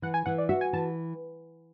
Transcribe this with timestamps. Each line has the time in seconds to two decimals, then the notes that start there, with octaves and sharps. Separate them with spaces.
0.02 E3 F#5
0.14 G#5
0.26 E3 F#5
0.38 D5
0.49 F#4 E5
0.61 G#5
0.73 E3 A5